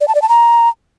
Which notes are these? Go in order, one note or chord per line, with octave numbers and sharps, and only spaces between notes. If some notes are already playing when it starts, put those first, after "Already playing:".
D5
A5
D5
A5
A#5